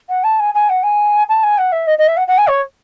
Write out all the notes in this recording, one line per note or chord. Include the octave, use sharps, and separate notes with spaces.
F#5
A5
G#5
G#5
F#5
G#5
A5
G#5
F#5
E5
D#5
D#5
E5
F#5
F#5
G#5
C#5